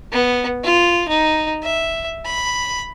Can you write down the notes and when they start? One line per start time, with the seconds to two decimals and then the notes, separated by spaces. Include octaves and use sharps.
0.12 B3
0.64 F4
1.08 D#4
1.63 E5
2.25 B5